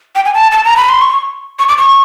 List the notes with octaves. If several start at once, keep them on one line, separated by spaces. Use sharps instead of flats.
G5
G#5
A5
A5
A#5
B5
C6
C#6
C#6
D6
C#6